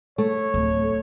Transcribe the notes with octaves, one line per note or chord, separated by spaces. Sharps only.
A3 C#5
D1